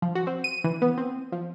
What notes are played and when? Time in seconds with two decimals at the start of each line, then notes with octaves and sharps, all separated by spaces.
0.02 F3
0.15 F#4
0.27 C4
0.44 D#7
0.64 E3
0.82 B3
0.97 C4
1.32 F3